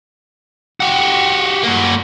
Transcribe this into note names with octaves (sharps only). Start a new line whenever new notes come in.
F#4 G4
A#3 F#4